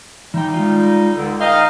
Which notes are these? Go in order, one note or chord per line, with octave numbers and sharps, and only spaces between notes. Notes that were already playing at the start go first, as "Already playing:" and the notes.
E3 G3 D#4 G5
G#3 F4
C#2 D3
D#4 D#5 F5 G5 F6